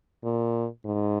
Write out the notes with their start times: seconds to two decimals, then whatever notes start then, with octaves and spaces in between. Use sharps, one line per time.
0.24 A#2
0.85 G#2